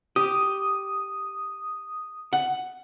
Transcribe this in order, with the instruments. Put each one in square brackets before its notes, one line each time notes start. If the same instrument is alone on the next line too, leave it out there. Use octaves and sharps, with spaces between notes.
[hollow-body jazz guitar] G4 [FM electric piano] D#6
[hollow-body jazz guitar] F#5